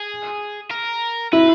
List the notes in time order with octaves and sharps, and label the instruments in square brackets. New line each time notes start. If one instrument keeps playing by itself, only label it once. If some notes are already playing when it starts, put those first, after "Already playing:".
Already playing: [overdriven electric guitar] G#4
A#4
[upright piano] E4 [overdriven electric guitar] B4